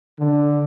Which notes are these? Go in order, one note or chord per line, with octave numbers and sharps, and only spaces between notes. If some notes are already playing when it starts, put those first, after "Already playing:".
D3